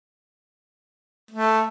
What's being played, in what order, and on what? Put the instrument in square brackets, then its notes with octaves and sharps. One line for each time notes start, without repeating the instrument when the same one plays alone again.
[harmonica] A3